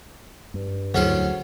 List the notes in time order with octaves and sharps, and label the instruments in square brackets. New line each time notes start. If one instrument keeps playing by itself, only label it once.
[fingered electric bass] G2
[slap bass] D2 D3 [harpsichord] F#3 C#4 C6 [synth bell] E4 G#4 C5